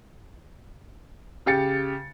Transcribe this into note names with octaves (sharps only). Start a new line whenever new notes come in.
C#3 G4 A6 C#7